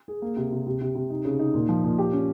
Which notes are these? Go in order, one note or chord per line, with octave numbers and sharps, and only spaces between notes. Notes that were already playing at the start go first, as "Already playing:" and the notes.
G#4
A#3
C3
C3
C3
C3
C3
D#4
C#3
D#4
A#2
F3
A#2
G4
C#4